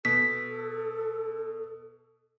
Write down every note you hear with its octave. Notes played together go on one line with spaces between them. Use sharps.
B2 A4 B6